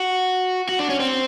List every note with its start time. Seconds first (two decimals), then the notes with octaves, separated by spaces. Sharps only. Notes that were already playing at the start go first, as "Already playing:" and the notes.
Already playing: F#4
0.69 F#4
0.79 D4
0.89 C#4
1.00 C4